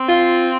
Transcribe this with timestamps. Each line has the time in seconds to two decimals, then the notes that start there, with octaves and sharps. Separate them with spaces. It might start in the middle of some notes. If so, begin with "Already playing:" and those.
Already playing: C4
0.09 F4